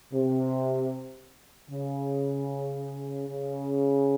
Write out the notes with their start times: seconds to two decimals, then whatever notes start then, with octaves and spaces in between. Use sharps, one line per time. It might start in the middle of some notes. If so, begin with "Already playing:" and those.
0.12 C3
1.70 C#3
3.28 C#3